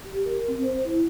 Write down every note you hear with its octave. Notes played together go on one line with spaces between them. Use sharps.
G4
A#4
C4
C5
E4